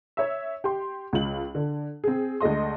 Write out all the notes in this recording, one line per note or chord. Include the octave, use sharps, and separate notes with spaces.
C#5 E5
G4 C6
C#2 F4 F#7
D3
C4 G#4
D2 G#3 A3 D#5 C6